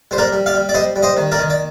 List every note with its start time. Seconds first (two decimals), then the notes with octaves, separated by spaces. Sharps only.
0.11 G3 C5
0.18 A#4 D5
0.33 G3
0.46 D5 F5
0.54 G3
0.69 D5
0.74 G3 C5 D#5
0.96 G3
1.03 C5 D#5
1.17 D#3
1.32 A#4 D5
1.38 D#3
1.50 D5